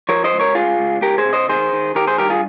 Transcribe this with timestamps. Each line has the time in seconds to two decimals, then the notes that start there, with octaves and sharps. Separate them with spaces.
0.09 F3 A#4 C#5
0.24 C5 D#5
0.33 C#2
0.39 A#4 C#5
0.55 C#2 F4 G#4
0.79 C#2
1.02 C#2 G4 A#4
1.18 G#4 C5
1.25 C3
1.33 C5 D#5
1.49 D#3 G#4 C5
1.73 D#3
1.95 D#3 G4 A#4
2.07 G#4 C5
2.18 G2 G4 A#4
2.30 F4 G#4